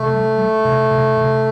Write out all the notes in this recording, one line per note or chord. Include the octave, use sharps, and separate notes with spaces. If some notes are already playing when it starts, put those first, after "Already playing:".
Already playing: C3 A3
G3
G3
C3
C3
C3